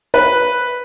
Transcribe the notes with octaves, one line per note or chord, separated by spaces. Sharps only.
B4